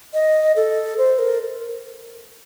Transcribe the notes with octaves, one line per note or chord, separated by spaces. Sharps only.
D#5
A4
C5
A#4